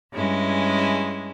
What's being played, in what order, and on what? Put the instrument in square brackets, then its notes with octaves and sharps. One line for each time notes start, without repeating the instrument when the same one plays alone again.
[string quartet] G2 G#3 C#4 E4